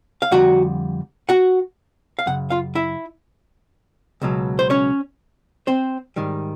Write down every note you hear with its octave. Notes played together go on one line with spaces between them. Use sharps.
F5
F2 D3 G3 F#4 F#5
F#4 F#5
F5
F#2 C#3 F#5
F4 F5
E4 E5
C#2 B2 F#3
C5
C#4 C#5
C4 C5
G#2 D#3 G3